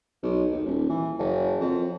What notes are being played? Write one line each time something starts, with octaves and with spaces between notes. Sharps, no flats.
B1
D#2
D#1
E3
F#1
F2